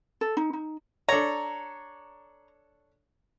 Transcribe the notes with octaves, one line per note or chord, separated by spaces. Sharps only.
A4
D#4
D#4
D4 A4 C#5 A#5